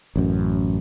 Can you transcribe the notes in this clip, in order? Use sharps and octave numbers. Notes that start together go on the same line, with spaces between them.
A1 F#2